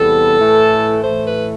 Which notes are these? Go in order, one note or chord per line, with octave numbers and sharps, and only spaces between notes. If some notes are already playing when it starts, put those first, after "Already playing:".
Already playing: E2 C3 G3 B3 A4
A2 E3 A3
A2 E3 A3 C5
B4